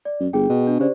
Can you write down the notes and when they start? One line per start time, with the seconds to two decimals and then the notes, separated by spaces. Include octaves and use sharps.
0.05 D5
0.20 F#2
0.33 G1 G#4 G5
0.49 B2
0.67 D4
0.80 C#3 G4 C5 D5